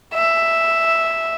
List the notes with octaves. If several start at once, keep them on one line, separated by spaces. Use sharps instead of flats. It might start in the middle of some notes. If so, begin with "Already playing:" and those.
E5